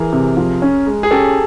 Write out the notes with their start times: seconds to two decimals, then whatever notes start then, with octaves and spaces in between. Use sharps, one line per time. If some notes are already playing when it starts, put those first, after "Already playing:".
Already playing: E3 G#4 A#4
0.13 C3
0.37 F3
0.62 C#4
0.87 G#3
1.03 G#4
1.11 C#4 G4 A4